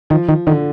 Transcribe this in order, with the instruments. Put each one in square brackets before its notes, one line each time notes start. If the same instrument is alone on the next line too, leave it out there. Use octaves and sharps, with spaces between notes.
[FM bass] D#3 [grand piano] F3
[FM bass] D#3
[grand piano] D3 [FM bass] D#3